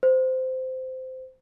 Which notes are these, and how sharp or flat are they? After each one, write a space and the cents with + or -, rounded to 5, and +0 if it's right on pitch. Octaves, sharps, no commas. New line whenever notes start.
C5 -15